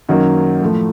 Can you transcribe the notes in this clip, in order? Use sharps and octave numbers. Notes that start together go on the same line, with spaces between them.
F#2 D#3 F#3 A#3
A2 F3 A3